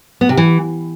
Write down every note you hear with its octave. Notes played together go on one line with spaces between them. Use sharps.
B3
C3
E3